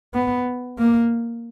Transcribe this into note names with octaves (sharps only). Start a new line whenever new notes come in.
B3
A#3